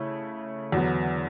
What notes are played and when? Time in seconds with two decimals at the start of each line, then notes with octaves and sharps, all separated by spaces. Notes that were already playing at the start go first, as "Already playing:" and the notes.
Already playing: C#3 A3 E4
0.72 E2 D3 F#3 B3